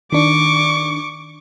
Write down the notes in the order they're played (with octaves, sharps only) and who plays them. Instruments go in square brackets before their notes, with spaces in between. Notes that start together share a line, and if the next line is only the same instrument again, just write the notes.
[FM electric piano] D#3 D4 [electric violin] C#6 D6